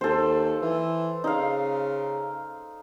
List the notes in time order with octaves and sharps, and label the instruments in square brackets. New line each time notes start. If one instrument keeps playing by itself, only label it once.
[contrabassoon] D#2 [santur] A4 C5
[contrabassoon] E3
[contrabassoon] C#3 [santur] D#4 F5